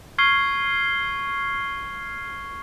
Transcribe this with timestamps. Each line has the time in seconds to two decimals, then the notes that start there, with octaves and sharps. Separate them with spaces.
0.18 C#6 F6 G#6 C7 G7